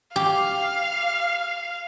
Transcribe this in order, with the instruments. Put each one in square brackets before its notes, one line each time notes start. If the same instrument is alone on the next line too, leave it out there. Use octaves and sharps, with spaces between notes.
[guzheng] G4 [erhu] F5